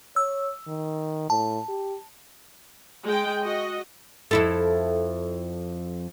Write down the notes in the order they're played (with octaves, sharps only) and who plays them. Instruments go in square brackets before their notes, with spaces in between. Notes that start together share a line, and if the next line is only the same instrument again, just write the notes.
[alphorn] C#5 [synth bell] E6
[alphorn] D#3
[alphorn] A2 [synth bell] A5
[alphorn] G4
[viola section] G#3 G5
F#4 D#5
[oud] F2 E4 A4